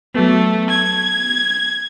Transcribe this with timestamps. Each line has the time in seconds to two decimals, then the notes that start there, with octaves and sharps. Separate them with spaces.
0.15 F#3 A3 B3
0.70 G#6